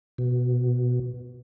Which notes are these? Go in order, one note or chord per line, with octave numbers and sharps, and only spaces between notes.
B2